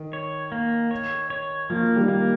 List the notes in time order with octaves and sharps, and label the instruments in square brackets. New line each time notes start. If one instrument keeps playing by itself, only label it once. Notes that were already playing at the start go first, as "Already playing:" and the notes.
Already playing: [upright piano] D#3
[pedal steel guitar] C#5
A#3
C#5
C#5
[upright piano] F3 [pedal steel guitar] A#3
[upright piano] D#3 G3
[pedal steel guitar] A#3